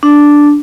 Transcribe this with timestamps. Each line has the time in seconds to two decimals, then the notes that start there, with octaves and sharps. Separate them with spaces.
0.03 D4